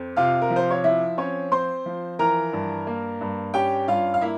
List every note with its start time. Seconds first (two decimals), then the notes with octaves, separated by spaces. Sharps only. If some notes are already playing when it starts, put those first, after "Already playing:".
Already playing: F2 C4
0.16 C3 F4 F5
0.42 A#4
0.50 F3
0.56 C5
0.71 C#5
0.84 F3 E4 E5
1.18 C4 C#4 C#5
1.52 C4 C5 C6
1.86 F3
2.19 E3 A#4 A#5
2.53 G2
2.87 A#3
3.21 G2
3.54 C#4 G4 G5
3.88 G2 F4 F5
4.14 F5
4.21 A#3 E4 E5